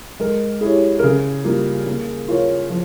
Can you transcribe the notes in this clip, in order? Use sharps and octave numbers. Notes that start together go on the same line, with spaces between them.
G#3 A#4
E4 G4 G#4 C#5
A#4
C#3 G#4
G3 A#3 F4 A#4
A#3
F4 A#4 C#5
F3